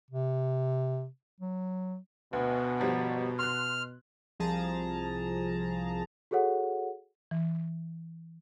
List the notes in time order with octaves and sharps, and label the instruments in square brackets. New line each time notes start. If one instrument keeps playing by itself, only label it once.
[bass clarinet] C3
F#3
[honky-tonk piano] D2 [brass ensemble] B2 [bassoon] B3
[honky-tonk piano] G1 F3 G3
[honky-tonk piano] C6 F#6 [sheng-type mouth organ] F6
[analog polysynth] C2 F3 G#4 A5 A#5
[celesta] F#4 G#4 A4 C#5 F#5
[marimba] E3